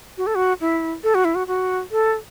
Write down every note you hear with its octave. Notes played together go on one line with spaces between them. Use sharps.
F#4
A4
F#4
E4
A4
F#4
E4
F#4
F#4
A4